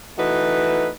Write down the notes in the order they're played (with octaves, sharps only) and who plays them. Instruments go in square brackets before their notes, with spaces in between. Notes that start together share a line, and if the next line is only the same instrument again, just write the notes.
[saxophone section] E3 A3 D#4 F#4 B4